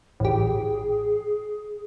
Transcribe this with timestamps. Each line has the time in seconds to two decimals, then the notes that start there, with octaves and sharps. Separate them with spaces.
0.20 A1 G4 G#4